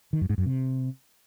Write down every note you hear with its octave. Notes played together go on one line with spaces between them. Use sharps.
D#3
F#2
G#2
F#2
C3